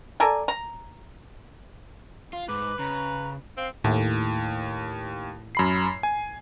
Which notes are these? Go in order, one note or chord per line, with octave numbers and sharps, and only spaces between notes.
A4 A#4 D5 G#5
A#5
F4 F5
G#2 B4 D6
C#3 A#5
C4 F5
D#2 A2
F#2 B5 C7
G#5